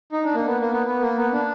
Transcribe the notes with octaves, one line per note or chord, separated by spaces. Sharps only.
D#4
D4
A#3
B3
A#3
B3
B3
A#3
B3
D4